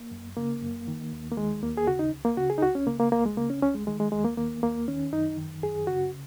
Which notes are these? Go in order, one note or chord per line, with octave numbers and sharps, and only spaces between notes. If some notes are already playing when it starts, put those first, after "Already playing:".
Already playing: A#3
F#2
C#3 A#3
F#2
D#3
D#2
A#3
D#3 G#3
D#2 A#3
G#4
C#3 F#4
D#4
C#2
A#3
C#3 F#4
G#4
D#4
C#2 F#4
C#4
C#3 A#3
A#3
C#2 A#3
G#3
C#3 A#3
C#4
C#2 C#4
G#3
D#3 G#3
G#3
D#2 G#3
A#3
D#3 A#3
D#2 A#3
D#3 C#4
F#2 D#4
D#3
F#2 G#4
C#3 F#4